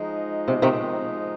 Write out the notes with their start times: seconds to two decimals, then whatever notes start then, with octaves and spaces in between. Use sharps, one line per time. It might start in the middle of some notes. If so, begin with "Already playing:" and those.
Already playing: F3 G#3 D#4
0.48 C3
0.62 C3 D#3